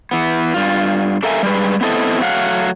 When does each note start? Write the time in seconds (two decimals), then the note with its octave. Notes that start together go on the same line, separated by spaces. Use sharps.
0.11 E3 B3
0.54 G2 F4
1.23 D4 A4 A#4 E5 F5 G#5
1.43 G3 G#3 B4
1.81 B3 C4 E4 A4 D#5
2.22 F#3 A3 F5 F#5